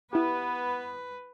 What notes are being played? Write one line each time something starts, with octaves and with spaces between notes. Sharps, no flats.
B3 E4 G4 B4